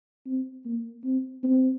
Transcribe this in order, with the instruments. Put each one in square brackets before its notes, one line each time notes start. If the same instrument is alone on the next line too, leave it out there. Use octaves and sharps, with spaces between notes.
[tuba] C4
A#3
C4
C4